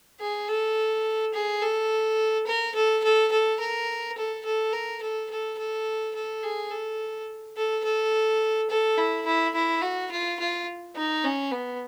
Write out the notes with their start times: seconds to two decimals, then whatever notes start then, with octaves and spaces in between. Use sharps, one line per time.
0.21 G#4
0.48 A4
1.34 G#4
1.62 A4
2.47 A#4
2.75 A4
3.04 A4
3.32 A4
3.60 A#4
4.17 A4
4.45 A4
4.73 A#4
5.02 A4
5.31 A4
5.58 A4
6.15 A4
6.43 G#4
6.71 A4
7.57 A4
7.84 A4
8.70 A4
8.98 E4
9.26 E4
9.54 E4
9.82 F#4
10.11 F4
10.40 F4
10.96 D#4
11.25 C#4
11.52 B3